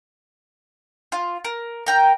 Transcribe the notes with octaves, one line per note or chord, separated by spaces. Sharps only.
F4
A#4
A#4 G5 A#5